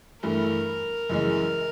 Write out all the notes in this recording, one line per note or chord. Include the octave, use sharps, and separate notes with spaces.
G2 E3 A3 A#4
F#2 C#3 E3 G#3